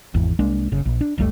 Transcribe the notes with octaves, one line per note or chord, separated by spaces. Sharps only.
G#1 E2
C2 G#3 A#3 D4
F#1 C#3
A#1
D4
F#1 C#2 G3 A3